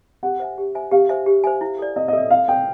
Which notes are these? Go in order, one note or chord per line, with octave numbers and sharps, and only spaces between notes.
G4 F#5
C5 E5 G#5
G4
C5 E5 G#5
G4 F5
C5 E5 G#5
G4
C5 E5 G#5
E4
A4 D5
E4 D#5
D#5
A4 D5 E5
E4 F5
A4 D5 G5